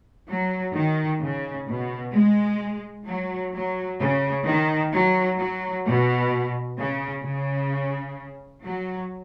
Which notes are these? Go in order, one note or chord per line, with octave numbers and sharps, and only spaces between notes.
F#3
D#3
C#3
B2
G#3
F#3
F#3
C#3
D#3
F#3
F#3
B2
C#3
C#3
F#3